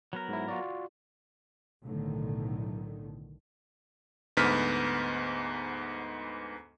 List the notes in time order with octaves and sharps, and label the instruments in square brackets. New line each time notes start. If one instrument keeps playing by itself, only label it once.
[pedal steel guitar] F#3 B3 A#4
[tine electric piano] G#2 E4
F4 F#4 D5
[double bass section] B1 A2 D3 D#3
[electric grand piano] D2 G#2 B3 F6 B6